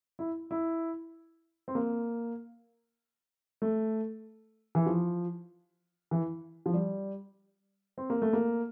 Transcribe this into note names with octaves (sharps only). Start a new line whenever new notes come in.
E4
E4
C4
A#3
A3
E3
F3
E3
F3
G3
C4
A#3
A3
A#3